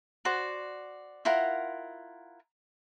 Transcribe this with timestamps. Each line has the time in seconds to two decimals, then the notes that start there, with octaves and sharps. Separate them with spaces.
0.25 F#4 C5 D5
1.25 E4 F4 A#4 F#5